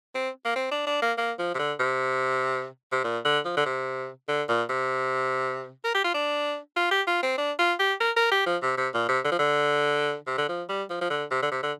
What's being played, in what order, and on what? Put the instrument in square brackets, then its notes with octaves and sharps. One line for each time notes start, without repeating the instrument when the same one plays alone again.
[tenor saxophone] C4
A#3
C4
D4
D4
A#3
A#3
F3
C3
D3
C3
C3
A#2
D3
F3
D3
C3
D3
A#2
C3
A#4
G4
F4
D4
F4
G4
F4
C4
D4
F4
G4
A#4
A#4
G4
F3
C3
C3
A#2
C3
D3
F3
D3
C3
D3
F3
G3
F3
F3
D3
C3
D3
C3
D3